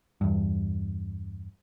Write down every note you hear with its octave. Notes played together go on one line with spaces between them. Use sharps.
E2 G2